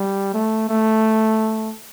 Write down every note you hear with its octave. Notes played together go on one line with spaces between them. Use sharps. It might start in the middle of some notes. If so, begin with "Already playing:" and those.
Already playing: G3
A3
A3